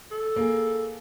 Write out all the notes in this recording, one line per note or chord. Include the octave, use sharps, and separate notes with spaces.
A4
A#3 G#4